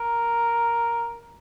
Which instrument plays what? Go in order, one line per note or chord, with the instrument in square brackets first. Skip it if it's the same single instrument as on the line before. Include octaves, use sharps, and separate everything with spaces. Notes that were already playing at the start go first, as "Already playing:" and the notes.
Already playing: [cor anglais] A#4